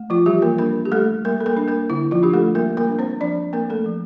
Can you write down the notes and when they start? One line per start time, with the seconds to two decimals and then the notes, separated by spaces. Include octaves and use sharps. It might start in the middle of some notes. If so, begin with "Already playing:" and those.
Already playing: A3
0.10 F3 F4
0.26 E3 G3 G4
0.42 A#3 A#4
0.58 A#3 D4 A#4
0.85 G4
0.92 G3 A3 A4
1.25 G3 A#3 A#4
1.40 A4
1.46 A#3 A#4
1.57 D4
1.68 A#3 A#4
1.90 D3 E4
2.11 F3 F4
2.23 D4 G4
2.33 A3 A4
2.55 G3 A#3 A#4
2.77 A#3 A#4
2.88 D4
2.99 C4 C5
3.20 F3 D4 D5
3.53 A#3 C4 A#4
3.70 A3 A4
3.86 F3